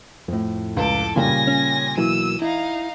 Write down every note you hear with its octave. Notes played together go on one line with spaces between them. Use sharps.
F2 A2
C#2 A4 D6
A#2 C#3 G3 G#5 A#6
C#4
B1 E3 F#3 A#3 E6 D#7
D#4 E4 F5